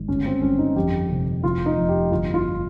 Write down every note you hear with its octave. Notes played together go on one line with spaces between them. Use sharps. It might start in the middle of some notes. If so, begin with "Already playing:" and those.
Already playing: G#1
G1 C#4
C4
G3 C#4
D#4
F2 G4
C3
F1 F4
D#4
F2
G4
G1 F4
F4